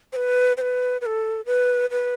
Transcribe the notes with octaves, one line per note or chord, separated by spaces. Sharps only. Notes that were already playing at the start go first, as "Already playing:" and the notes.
C5
B4
C5
B4
B4
A4
B4
B4